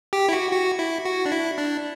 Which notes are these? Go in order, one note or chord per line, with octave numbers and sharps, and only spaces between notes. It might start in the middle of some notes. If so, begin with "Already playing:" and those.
G4
E4
F#4
F#4
E4
F#4
D4
E4
D4